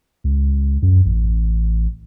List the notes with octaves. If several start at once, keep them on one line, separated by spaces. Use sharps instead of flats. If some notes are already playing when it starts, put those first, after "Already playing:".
C#2
F#2
A1